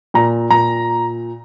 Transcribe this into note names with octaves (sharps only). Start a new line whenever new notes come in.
A#2 A#5
A#2 A#5